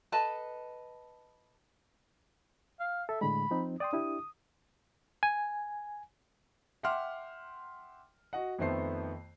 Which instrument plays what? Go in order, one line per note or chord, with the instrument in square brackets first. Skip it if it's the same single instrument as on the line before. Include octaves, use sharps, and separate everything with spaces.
[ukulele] A4 B4 D#5 A5
[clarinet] F5
[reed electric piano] A4 [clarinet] E5
[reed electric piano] A2 D3 G#3 [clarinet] B5
[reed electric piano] F3 C4 D#4
[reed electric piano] D5 G5 C6 [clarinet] D#6
[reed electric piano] D4 E4 G4
G#5
[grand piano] E5 F#5 G5 C6 D6 F6
F#4 D#5 F#5
F2 D#3 A3 B3 C5 C7